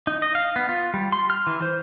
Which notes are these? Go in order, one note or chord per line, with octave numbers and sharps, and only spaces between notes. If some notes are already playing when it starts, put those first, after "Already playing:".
D#4
D#5
F5
B3
F4
G3
C6
F6
E3
C5